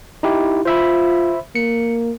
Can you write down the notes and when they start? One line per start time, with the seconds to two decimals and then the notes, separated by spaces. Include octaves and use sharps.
0.23 D#4 E4 G4
0.65 F4 C5 E5 B5
1.55 A#3 C#7